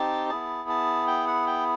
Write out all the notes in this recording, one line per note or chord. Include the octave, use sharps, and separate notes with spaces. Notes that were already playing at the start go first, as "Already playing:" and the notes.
Already playing: C4 D#4 G4 A5
B3 E4 G#4 A5
A5
G5
F#5
G5